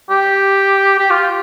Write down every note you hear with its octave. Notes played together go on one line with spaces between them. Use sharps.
G4
G4
F4